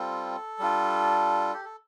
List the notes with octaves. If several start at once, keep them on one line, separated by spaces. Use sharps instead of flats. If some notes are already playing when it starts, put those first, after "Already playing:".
Already playing: G3 C4 F4 A4
G3 D4 F4
G4
A4